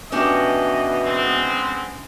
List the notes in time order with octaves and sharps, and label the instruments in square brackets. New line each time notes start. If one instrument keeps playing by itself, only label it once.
[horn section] B2 E3 D#5 [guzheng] C#4 D4 G4
[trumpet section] G#3 B3 C4